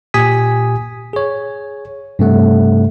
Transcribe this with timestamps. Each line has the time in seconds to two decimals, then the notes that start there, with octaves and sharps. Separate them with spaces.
0.14 A#2 G4 G#5 D#6 B6
1.13 G#4 C#5
2.19 G2 C3 A3 F#5